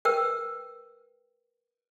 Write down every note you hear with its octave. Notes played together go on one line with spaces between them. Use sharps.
A#4 B4 G5 E6